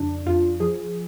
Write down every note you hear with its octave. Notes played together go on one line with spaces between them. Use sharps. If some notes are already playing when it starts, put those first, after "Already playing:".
Already playing: F2 C#3 D4
F2 F4
F3 G#4